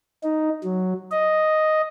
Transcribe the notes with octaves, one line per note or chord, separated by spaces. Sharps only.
D#4
F#3
D#5